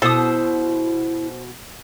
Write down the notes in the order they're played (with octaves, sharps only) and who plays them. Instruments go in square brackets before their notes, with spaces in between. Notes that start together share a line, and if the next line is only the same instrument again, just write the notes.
[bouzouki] B2 [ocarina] E4 [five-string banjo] A4 [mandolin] C5 D#6